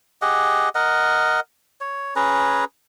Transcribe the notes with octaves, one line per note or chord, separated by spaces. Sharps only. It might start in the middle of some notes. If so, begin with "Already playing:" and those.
G4 G#4 D#5 F#5
A#4 D#5 F#5
C#5
C#4 G#4 B4 A#5